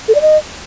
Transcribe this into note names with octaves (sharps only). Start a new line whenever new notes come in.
A4
D5
D#5